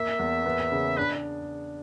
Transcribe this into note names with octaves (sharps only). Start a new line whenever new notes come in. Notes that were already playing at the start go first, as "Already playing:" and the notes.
Already playing: A#3 E5
E2
B3
C#3
D4 B4